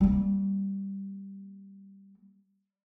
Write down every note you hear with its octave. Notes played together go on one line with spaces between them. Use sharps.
G3 A#3